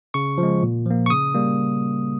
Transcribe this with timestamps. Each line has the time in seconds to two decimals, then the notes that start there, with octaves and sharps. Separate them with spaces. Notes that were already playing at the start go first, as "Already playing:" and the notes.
0.14 C#3 C#6
0.38 F3
0.43 G#3
0.63 A#2
0.86 F3 A#3
1.06 C#6
1.10 C#3 D#6
1.35 G3 A#3